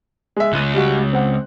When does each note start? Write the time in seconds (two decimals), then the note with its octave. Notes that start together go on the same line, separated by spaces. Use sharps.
0.36 G#3 E5
0.53 C#2 F#6 D#7
0.74 G3 F#4
1.13 C4 F#5